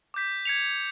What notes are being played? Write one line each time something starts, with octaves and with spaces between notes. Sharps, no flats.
D6 G6 B6
G#6 C#7 F7